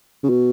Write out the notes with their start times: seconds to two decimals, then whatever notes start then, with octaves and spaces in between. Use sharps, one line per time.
0.23 C#3
0.29 B2